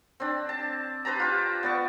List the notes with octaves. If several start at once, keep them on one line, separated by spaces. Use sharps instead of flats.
C4 D4
A5
B4 C5 A5 A#5
F4 G4
B3 D5 C#6